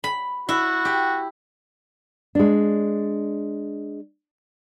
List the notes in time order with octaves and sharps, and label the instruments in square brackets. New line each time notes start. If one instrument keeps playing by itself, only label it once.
[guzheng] B5
[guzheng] E4 [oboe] F#4
[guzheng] G4
[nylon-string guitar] G#3 D4